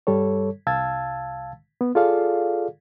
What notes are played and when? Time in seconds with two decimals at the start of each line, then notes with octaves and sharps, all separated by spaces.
0.07 G2 G3 A4 C#5
0.67 C2 F5 A5 E6 G#6 A6
1.81 B3
1.95 F4 G#4 A4 D5 F5